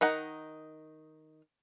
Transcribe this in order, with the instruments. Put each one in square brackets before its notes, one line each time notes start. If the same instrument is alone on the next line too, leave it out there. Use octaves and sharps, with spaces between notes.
[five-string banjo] D#3 D#4 F#5 A#5